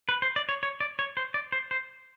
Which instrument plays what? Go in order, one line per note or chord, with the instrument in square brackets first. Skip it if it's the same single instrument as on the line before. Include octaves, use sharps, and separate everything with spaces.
[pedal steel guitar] B4
C5
D5
C#5
C#5
D5
C#5
C5
D5
C5
C5